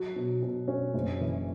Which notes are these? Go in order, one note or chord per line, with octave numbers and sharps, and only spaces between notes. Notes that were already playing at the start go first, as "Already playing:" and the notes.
Already playing: F#3
B2
B2
C#4
F#1
E3